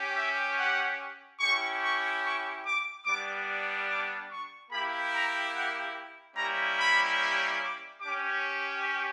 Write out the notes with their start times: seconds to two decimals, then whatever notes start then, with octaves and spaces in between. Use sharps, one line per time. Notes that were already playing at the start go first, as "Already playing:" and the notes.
Already playing: C#4 G4
0.17 E5
0.59 F#5
1.40 C#4 E4 G4 C#6
1.82 C#6
2.23 C#6
2.64 D6
3.06 G3 B3 D4 D6
3.88 D6
4.30 C#6
4.71 A#3 E4 G4 B5
5.13 A#5
5.53 F#5
6.36 G3 A#3 C#4 E4 G4 A#5
6.77 B5
7.59 D6
8.01 C#4 G4 D6